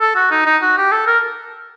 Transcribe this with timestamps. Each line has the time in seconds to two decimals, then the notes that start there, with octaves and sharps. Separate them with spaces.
0.01 A4
0.16 F#4
0.32 D#4
0.46 D#4
0.62 F#4
0.78 G4
0.92 A4
1.07 A#4